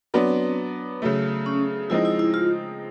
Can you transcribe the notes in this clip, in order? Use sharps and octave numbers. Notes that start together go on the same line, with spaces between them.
F#3 B3 C4 D4
C#3 F#3 A3
C#4
F3 G#3 C4 D#4 E4
E4
E4
F4